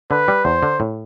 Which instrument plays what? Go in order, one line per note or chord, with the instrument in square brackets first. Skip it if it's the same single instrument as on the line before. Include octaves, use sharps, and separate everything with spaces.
[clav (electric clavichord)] D3 [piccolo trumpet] B4
[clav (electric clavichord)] G3
[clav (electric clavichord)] E2 [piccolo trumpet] C5
[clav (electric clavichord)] D3
A2